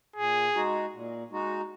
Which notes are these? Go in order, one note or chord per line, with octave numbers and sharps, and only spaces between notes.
A#2 G#4
G#3 D#4 F#4
A#2
G#3 D#4 F#4